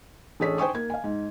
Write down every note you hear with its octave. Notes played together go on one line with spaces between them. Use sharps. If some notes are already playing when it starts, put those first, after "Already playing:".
A1 D4 G#4 A4 C#5 B6
C5 G5 G#5 C#6 D#6
A#3 G#6
F5 G#5
G#2